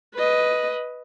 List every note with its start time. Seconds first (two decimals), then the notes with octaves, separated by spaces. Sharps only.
0.15 B4 D#5